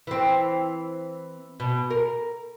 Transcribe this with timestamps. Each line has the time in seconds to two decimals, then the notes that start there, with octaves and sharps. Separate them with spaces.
0.07 E3 C4
1.60 B2
1.90 A#4